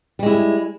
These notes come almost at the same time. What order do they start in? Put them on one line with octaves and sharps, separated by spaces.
G3 G#3 E4